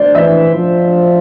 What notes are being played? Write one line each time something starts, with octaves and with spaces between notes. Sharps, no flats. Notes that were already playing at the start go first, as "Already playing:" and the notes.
Already playing: C5 D5
E3 E5
F3